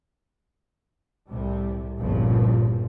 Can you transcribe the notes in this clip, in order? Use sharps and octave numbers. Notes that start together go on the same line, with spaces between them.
C2 A2 C3 G3
G1 C2 G2 A#2 C#3 F3